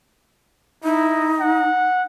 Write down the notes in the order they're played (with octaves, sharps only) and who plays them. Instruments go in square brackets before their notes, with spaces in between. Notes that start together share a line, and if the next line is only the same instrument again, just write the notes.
[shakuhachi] D#4 [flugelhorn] E4
[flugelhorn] F#5